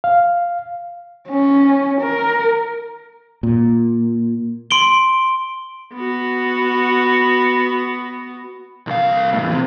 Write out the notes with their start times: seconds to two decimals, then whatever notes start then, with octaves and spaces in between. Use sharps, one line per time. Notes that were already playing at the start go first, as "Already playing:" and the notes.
0.04 F5
1.30 C#4
2.01 A#4
3.43 A#2
4.71 C6 D7 G7
5.94 B3 F#4
8.87 C2 F5
9.33 E2 A2
9.51 C3 E3